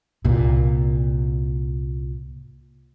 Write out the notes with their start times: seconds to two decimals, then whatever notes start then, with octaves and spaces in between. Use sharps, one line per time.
0.25 C2 A#2